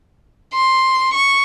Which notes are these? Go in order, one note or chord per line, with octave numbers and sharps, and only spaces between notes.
C6
C#6